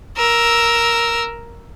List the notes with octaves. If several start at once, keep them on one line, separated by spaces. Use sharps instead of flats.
A#4 E6